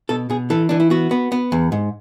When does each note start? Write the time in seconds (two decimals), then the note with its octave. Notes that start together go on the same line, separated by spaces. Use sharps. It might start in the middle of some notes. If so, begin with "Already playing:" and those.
0.09 B2 A4
0.30 B2 G#4
0.50 E3 A4
0.69 E3 D4
0.80 E4
0.90 B3 F#4
1.11 B3
1.32 B3
1.52 E2
1.72 G#2